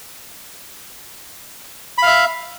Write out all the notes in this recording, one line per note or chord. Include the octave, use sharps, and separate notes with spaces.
E5 F5 B5